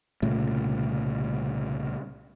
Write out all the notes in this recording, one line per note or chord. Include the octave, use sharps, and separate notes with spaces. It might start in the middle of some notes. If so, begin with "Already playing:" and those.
C2 A#2 C#3 A3